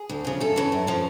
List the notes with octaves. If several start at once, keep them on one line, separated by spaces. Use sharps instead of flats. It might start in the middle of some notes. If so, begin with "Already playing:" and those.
Already playing: G#4
D2
C#3 F3
F#2 A4
C#3 E3
F#2
C#3 F3